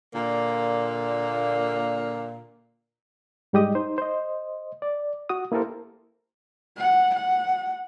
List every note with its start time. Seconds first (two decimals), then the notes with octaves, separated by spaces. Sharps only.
0.15 A#2 D3 A#3
3.53 G#2 G3 G#3 G4 D#5 D#6
3.75 D#4 C5
3.98 C5 D#5
4.82 D5
5.29 F#4 D#6
5.52 A#3 E4 G4 A4 A#4 C5
6.78 F#5
7.15 F#5